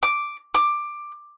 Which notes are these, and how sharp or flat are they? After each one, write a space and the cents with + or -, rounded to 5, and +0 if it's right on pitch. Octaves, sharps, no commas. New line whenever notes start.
D6 +0
D6 +10